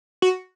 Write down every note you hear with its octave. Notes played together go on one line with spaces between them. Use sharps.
F#4